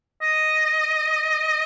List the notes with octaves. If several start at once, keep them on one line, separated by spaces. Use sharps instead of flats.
D#5